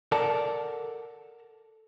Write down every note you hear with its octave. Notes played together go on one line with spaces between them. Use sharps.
A4 A#4 D5 F#5 A5